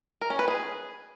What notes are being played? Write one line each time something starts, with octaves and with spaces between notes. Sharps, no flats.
A#4
C#4
B4
G#4